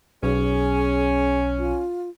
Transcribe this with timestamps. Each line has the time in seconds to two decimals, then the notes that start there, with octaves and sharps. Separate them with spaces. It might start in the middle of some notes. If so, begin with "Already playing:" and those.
0.23 B1 C#4 G#4
1.59 F4